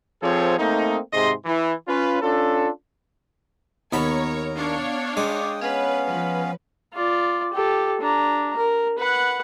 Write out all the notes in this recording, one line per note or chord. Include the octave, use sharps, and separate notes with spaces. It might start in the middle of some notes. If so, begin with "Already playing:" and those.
F3 C4 F4 G#4 A4 C#5
A3 A#3 C4 D#4
G#2 C3 G#4 D#5 C6
E3
C#4 F4 B4
C#4 D4 F4 A4
D#2 B3 A#4 C#5 A#5 B5
D4 C#5 F5
G#3 G5 D6 D#6
B3 C#4 B4 C#5 F5
F3 B4
F4 D5
G4 A4
D4 A#5
A#4
B4 F#5